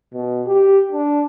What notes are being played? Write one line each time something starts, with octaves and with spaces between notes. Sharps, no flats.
B2
G4
D4